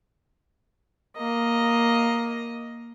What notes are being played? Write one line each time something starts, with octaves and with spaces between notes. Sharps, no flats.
A#3 D#5